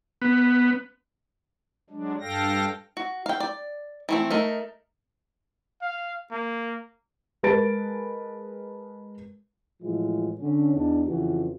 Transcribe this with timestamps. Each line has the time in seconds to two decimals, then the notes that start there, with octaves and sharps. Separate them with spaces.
0.22 B3
1.90 F#3 G#3 D4
2.21 G2 A4 F5 G5 A#6
2.97 F#4
3.26 F5 G5
3.40 D5
4.09 E3 A3 C4
4.31 A3 D#4 A#4
5.81 F5
6.31 A#3
7.43 G#3 A#4 B4 A5 A6 D7
9.82 A2 E3 F3 G#3 E4 F4
10.39 D3 C#4
10.73 E2 D4 D#4
11.07 F2 C#3 E3 F4 F#4